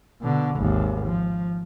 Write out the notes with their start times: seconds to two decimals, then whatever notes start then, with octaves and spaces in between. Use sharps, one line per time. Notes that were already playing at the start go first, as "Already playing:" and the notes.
0.21 B2 D3
0.55 G#1 D#2
1.06 F3